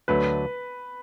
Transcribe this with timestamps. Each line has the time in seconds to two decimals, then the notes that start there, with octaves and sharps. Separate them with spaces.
0.08 D2 D3 F#3 A3 D4 B4